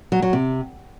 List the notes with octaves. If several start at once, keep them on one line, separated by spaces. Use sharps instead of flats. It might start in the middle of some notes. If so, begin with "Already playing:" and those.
F#3
F#3
C3